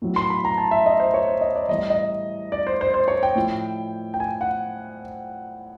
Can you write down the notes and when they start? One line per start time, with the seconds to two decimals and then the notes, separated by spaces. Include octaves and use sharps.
0.02 A2 F#3
0.16 C6
0.30 B5
0.45 A#5
0.58 A5
0.71 E5
0.86 D#5
1.00 C5
1.14 C#5
1.28 C5
1.41 D#5
1.56 D5
1.69 A2 E3 G3 D#5
1.90 D#5
2.52 D5
2.67 C5
2.81 C5
2.94 C5
3.08 C#5
3.23 G5
3.35 A2 F3
4.14 G5
4.20 G#5
4.41 F#5